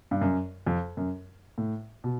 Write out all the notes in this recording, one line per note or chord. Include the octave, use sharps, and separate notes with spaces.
G2
F#2
F2
F#2
A2
B2